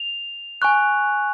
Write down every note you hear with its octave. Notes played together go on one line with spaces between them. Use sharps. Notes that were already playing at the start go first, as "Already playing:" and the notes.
Already playing: F7
G#5 C#6 F#6